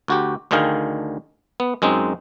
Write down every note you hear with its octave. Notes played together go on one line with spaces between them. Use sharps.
D2 F#4 G4
D2 D3 D#3 G#4 F5 G5
B3
F#2 G#3 C4 D#4